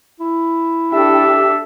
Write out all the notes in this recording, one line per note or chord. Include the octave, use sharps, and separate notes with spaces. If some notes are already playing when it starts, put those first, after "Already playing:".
E4
D4 G4 A4 E5